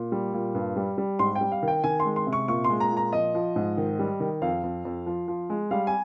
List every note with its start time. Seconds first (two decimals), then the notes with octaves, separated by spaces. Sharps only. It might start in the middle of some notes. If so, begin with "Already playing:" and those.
Already playing: A#2
0.12 G3
0.33 A#2
0.55 G2
0.76 G3
0.98 G3
1.19 G#2 C6
1.35 G5
1.41 G3
1.52 F5
1.62 D#3
1.68 G5
1.84 D#3 G#5
2.00 C6
2.05 G#3
2.16 C6
2.27 C3
2.33 C#6
2.48 A#2 C#6
2.64 C6
2.70 G#3
2.80 A#5
2.92 A#2
2.97 A#5
3.13 F3 D#5
3.35 F3
3.56 G#2
3.77 D#3
3.99 G3
4.20 D#3
4.42 F2 F5
4.63 F2
4.85 F2
5.06 F3
5.28 F3
5.50 G#3
5.71 G3 F5
5.87 G#5